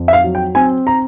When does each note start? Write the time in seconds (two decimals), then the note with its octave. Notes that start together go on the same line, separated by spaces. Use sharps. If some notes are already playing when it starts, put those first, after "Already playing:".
Already playing: F2
0.08 E5
0.13 F5
0.24 F#3
0.35 G5
0.55 C4 G#5
0.87 A#5